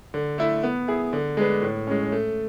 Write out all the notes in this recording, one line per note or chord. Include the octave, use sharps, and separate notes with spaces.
D3
A3 E4
B3
E4 G#4
D3
G#3 D4 G#4 B4
A2
G#3 C#4
A3